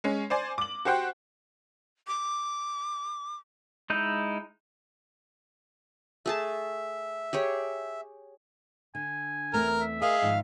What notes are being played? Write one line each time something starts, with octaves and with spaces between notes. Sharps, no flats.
G#3 C#4
C5 D5 G#5
D6 F#7
F#4 G4 C5 F#5 G5
D6
G#3 D#4 E4 G6
A3 G#4 E5 A5
G4 G#4 C#5
D3 G#5
E2 A3 C4 A#4 F6
E5
G#4 A#4 D#5 F5
G#2 D#3 F3